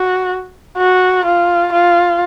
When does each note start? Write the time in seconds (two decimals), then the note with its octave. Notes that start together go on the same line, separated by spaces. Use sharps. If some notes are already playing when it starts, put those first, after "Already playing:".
Already playing: F#4
0.77 F#4
1.25 F4
1.72 F4